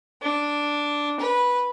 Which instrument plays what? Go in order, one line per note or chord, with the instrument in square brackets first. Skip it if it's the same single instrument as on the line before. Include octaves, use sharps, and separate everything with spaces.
[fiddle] D4
B4